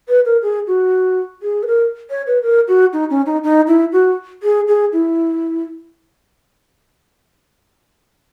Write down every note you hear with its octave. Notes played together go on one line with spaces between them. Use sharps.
B4
A#4
G#4
F#4
G#4
B4
A#4
C#5
B4
A#4
F#4
D#4
C#4
D#4
D#4
E4
F#4
G#4
G#4
E4